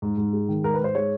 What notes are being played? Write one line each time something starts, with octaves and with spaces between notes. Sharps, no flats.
G#2
G#2
G#3
D#3
G#2 A#4
B4
G#2 C5
G#3 C#5